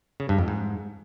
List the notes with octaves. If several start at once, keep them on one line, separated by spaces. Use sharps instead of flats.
C#3
G2
F2
G#2